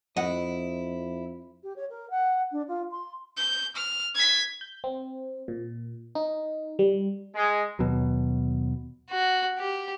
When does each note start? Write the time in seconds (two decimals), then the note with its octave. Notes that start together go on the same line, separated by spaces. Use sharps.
0.17 F2 E4 D#5 F#5
1.63 G4
1.76 C#5
1.90 A#4
2.10 F#5
2.52 D4
2.68 F4
2.91 C6
3.37 G6
3.76 F6
4.15 G#6 B6
4.61 G6
4.84 C4
5.48 A#2
6.15 D#4
6.79 G3
7.35 G#3
7.79 D#2 B2 F#3
9.10 F#4
9.58 G4